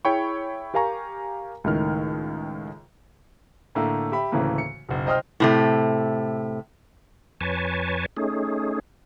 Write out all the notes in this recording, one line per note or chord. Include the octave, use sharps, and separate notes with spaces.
E4 G#4 C#5 G5 B5 C#6
G4 A#4 F5 G#5 A#5 C#6
C#2 A2 D#3 F6
A2 D3 A3 A#3
G4 E5 B5
D2 A2 C#3 E3 A3 A#3
C#7
F#1 B1
C2 C5 D#5 G5 D#6 F6
A2 C3 A3
F2 B4 C#5 G#5 A5
A3 C#4 D#4 G#4